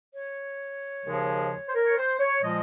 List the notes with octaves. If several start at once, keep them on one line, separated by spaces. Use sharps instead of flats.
C#5
D#2 C#3 F3 G#3
C5
A#4
C#5
C5
C#5
A#2 F3 G#3 D#5